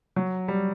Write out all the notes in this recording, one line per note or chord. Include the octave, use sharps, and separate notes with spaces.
F#3
G3